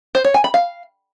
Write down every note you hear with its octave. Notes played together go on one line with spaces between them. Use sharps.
C5
C#5
G#5
B5
F5